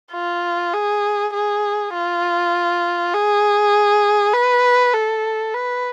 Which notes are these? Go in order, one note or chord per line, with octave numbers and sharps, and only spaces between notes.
F4
G#4
G#4
F4
G#4
B4
A4
B4